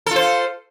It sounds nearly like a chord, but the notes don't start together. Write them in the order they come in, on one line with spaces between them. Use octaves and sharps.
A4 F4 C5